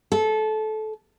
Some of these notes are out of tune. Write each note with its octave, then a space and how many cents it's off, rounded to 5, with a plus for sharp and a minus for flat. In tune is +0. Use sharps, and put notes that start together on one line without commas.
A4 -20